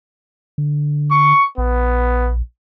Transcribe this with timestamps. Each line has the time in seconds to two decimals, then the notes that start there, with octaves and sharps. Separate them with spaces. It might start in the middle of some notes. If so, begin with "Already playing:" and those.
0.58 D3
1.11 C#6
1.58 A#1 B3